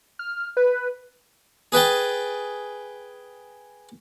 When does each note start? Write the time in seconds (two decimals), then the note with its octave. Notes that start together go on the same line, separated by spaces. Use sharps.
0.19 F6
0.57 B4
1.72 G#4 B4 G5 A5